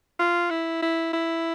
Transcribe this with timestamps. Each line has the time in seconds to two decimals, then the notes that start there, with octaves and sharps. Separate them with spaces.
0.19 F4
0.50 E4
0.82 E4
1.13 E4